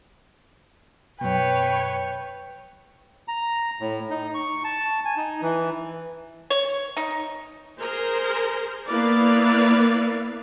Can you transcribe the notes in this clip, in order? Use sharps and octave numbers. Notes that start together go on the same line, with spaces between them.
F#2 B2 B4 C#5 G5
A#5
A2
D#4
C#6
A5
G#5
D#4
E3
C#5
D#4
G#4 A#4 C5
A#3 B3 E4 B4 D5 F5